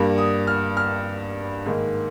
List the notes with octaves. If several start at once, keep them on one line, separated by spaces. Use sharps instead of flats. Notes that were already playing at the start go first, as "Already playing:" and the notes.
Already playing: G2 G3 A#3
D#6
F6
F6
G#2 D#3 A#3